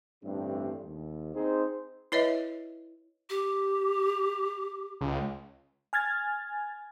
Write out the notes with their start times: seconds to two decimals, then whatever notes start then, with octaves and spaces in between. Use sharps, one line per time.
0.24 A1 G2 D3 A3 C4 D4
0.84 D#2
1.35 C4 D#4 G#4 C5
2.12 E4 B4 C#5 D#5 E5
3.30 G4
5.01 C#2
5.93 G#5 F6 G#6 A6